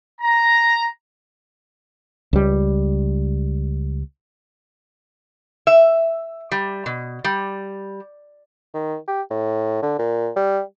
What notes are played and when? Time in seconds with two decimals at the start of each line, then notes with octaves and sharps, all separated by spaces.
0.20 A#5
2.33 C#2 G3
5.67 E5
6.51 G3
6.86 B2
7.24 G3
8.74 D#3
9.07 G4
9.30 A2
9.82 D3
9.98 A#2
10.36 G3